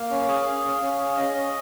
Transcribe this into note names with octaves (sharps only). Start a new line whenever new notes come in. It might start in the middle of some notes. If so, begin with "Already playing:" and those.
Already playing: A#3 F5
C#4
G#4
G#4
C#4
C#4
G#4
C#4 D#5
C#4